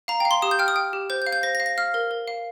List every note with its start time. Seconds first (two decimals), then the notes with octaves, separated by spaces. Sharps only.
0.08 F5 A#5
0.20 G5
0.25 F5
0.31 C6
0.42 G4 D#6
0.51 G6
0.59 G5 F6
0.68 D#6
0.76 G5
0.93 G4
1.10 C5 G6
1.22 G6
1.27 F5
1.32 G6
1.43 C5 A#6
1.55 A#6
1.60 F5
1.66 A#6
1.78 F5 F6
1.94 A#4
2.11 A#4
2.28 F5